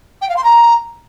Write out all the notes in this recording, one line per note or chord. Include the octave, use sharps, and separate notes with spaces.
G5
F5
C6
A#5